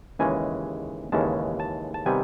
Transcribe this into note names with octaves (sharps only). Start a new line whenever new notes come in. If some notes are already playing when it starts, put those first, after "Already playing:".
D#2 C#3 E3 G#3 C#4 G#5
D#2 C#3 E3 G#3 C#4 A5
A5
A5
C3 D#3 G3 B3 G#5